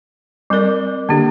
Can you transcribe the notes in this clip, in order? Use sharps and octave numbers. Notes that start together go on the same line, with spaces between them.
G3 C4 A#4 D5
D3 A#3 D4 G4